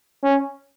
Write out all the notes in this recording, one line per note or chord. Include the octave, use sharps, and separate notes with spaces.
C#4